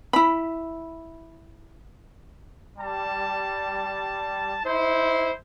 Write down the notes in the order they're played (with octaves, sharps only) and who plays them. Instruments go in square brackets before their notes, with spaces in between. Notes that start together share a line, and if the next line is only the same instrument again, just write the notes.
[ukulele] E4 B5
[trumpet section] G3 A5
D#4 E4 C5